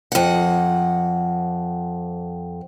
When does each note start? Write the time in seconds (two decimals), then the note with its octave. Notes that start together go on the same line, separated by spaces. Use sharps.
0.12 F2 F#5